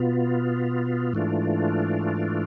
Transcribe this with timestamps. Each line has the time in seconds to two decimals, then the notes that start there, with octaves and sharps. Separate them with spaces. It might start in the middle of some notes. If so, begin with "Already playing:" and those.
Already playing: B2 B3 F4
1.13 G#2 E3 A3 D4 F4